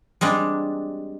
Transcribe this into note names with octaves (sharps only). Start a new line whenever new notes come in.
G3 G#3 C4 D4